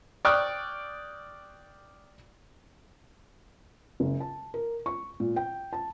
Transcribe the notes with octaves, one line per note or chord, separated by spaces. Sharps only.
D5 G5 C#6 D#6 F6 F#6
F#1
A5
A#4
C#6
A#2
G5
A5